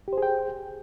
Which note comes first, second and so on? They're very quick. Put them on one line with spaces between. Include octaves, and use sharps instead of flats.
G4 C5 G#4 G5